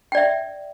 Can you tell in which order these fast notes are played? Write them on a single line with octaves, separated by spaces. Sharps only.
G5 D5 E5